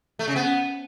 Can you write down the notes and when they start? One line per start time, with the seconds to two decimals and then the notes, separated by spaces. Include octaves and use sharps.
0.19 A3
0.28 C#3
0.36 B3